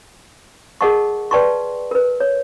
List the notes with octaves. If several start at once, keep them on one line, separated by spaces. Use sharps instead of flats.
G#4 A#4 D#5 F#5 A5 C#6
B4 D5 G5 A5 C6 C#6
A#4 B4
C#5